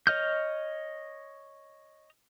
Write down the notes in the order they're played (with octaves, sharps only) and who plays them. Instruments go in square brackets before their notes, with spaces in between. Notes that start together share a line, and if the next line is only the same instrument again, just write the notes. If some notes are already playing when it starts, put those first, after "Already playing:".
[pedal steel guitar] C#5 D#5 F6 G6